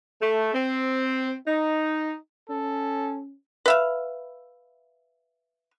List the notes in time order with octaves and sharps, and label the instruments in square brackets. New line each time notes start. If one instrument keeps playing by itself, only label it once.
[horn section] A3
C4
D#4
[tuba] C#4 [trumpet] A4
[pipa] B4 E5 F5